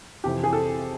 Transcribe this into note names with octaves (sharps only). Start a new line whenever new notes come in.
F2 C3 E3 G4
G#4
A4